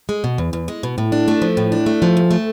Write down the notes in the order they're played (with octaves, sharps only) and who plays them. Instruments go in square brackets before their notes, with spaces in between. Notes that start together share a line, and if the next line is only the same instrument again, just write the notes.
[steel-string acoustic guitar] G#3
B2
E2
E2
G#3
B2
A2
D4
A3
F3
A2
D4
A3
F3
D2
A3